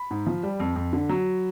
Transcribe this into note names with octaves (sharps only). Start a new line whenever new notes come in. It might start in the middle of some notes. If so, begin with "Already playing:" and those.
Already playing: B5
G#2
F3
G3
F2
F2
D3
F#3